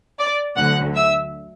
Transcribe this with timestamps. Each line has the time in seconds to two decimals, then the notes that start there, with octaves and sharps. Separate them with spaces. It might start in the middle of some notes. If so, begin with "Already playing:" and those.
0.19 D5 D6
0.56 D2 D3 F#3 F#5 F#6
0.94 E5 E6